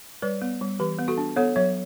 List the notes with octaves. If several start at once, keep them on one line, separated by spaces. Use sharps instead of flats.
G3 B4 D5
B3
G3
E3 G4 B4
B3
F#4 A4
D4
B3 A4 C#5
F#3 C#5 E5